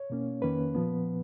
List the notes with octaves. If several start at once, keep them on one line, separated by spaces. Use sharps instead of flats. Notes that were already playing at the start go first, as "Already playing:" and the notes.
Already playing: C#5
B2 A#3 C#4
F2 D#3 A#3 C#4 B4
A#2 F3 B3